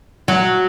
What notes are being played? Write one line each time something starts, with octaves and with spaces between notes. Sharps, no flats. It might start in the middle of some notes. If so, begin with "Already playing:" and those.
F#3